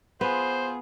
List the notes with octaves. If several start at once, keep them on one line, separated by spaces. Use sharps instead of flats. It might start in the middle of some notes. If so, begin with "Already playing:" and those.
B3 F4 G#4 C5